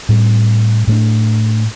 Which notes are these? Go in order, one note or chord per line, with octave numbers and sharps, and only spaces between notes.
A2 G3 C4
A2 A3 D4